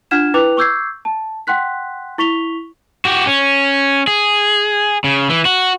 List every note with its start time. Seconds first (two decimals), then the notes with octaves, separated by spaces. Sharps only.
0.11 D4 F4 F#5 F6 G#6 E7
0.34 E4 B4 G5 D6 F#6 F7
0.57 C#6 D6 E6 G6 G#6 C7
1.05 A5
1.47 F#5 G5 C6 F#6 B6
2.18 E4 C#6 B6 F7 G7
3.05 F#4 G4
3.27 C#4
4.07 G#4
5.04 C#3
5.30 E3
5.45 F#4